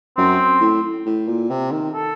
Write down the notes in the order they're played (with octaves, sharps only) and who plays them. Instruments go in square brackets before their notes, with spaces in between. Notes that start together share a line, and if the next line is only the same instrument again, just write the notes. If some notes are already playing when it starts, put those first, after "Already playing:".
[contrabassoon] F#2 [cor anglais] C4
[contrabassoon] A2
A2
A#2
C3
D#3
[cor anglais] A4